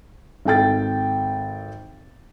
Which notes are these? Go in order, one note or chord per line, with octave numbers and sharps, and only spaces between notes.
G#1 A4 G5 A6